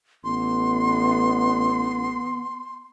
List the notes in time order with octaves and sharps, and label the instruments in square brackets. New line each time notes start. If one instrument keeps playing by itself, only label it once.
[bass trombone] A1 [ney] B3 [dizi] C6